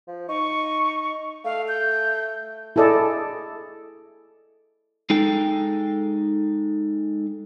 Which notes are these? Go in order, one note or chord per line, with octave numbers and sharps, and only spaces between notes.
F3
D#4 C#6
A3 F5
G6
E4 G#4 A4 D5 D#5
G#3 D#4 A4 G5